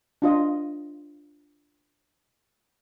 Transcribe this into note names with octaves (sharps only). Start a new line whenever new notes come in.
D4 F4 D#5